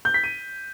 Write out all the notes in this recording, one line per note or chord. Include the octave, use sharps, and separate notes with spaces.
G6
B6
D#7